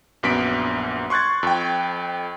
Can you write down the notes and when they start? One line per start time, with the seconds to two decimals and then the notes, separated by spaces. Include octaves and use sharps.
0.23 A#1 F#2 B3 B6 D7
1.10 C6 C#6 F#6 G#6 A6
1.43 F2 G5